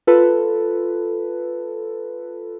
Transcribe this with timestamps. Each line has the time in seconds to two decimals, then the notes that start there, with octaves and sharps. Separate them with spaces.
0.07 F4 A4 B4